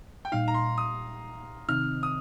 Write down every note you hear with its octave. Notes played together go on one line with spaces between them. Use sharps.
G5
A#2 G3 D#4 F5
A#5
C6
D#6
C3 D#3 C4 D#4 F6
D#6